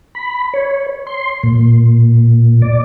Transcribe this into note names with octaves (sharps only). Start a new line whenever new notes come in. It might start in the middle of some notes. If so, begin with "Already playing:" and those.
B5
C#5
C6
A#2
D5